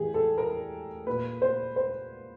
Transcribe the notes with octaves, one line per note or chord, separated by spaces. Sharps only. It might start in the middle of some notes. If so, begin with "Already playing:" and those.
Already playing: A2 E3 G4 G#4
A4
A#4
A#2 B4
C5
C5